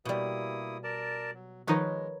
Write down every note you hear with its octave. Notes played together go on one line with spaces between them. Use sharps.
B2 G3 A#3 E4 D#6
A#4 D5 A5
F#3
D#3 F3 G#3 D#4 A#4 B4 C#5